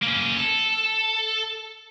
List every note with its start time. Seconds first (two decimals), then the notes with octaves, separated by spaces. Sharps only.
0.03 A#3 C#4
0.37 A4